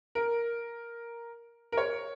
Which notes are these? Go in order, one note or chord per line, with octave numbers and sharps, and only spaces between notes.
A#4
A#4
C#5